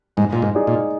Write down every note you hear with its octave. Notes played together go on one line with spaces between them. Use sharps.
G#2 G#3
A#2
G#2
D#4 G#4 D5
A#2